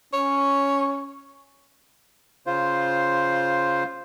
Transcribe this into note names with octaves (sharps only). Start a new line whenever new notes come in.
C#4 C#5
C#3 F4 C5